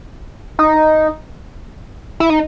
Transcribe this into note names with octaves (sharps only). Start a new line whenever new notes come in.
D#4
E4
D#4